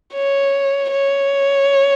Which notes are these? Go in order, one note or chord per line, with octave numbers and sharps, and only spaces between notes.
C#5
C#5